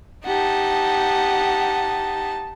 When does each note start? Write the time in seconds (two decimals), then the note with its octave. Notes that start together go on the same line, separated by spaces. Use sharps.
0.26 D#4 G4 F#5 A5